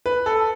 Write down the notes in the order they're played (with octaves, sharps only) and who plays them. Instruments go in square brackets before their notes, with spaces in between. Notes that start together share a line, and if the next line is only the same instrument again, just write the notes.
[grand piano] B4
A4